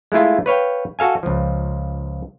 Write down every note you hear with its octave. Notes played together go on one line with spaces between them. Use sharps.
G#3 A3 E4 F4
B4 C#5 F5 G5
F#4 A4 F5 G#5
C#2 F3